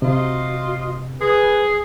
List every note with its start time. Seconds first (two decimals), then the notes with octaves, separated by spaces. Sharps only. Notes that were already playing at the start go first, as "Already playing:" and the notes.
0.02 C3 F4 F#4 C5 D#5
1.20 G#4 B4